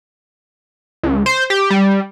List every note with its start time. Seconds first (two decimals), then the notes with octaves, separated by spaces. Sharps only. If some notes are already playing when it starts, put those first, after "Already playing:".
1.03 C#2
1.26 C5
1.50 G4
1.70 G3